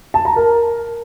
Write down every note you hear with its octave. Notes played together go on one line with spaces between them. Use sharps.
A5
A#5
A#4